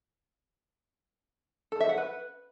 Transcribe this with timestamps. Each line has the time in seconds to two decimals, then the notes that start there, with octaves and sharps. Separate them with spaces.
1.72 A4
1.80 E5
1.89 F#5
1.98 B4